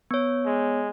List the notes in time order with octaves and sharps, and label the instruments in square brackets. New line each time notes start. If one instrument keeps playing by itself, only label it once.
[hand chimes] B3 C#5
[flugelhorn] G#3